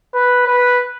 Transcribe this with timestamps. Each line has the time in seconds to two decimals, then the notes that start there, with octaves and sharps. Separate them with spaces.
0.15 B4
0.47 B4